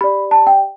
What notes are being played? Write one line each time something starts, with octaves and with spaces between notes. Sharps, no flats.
G4 D5 B5
A5
G5